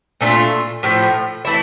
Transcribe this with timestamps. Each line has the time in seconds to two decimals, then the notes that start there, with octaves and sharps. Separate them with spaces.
0.21 A#2 A3 D4 F4
0.83 A2 F3 A3
1.45 E3 A3 E4